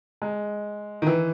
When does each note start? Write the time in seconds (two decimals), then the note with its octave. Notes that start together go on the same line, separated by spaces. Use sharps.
0.22 G#3
1.02 D#3
1.07 E3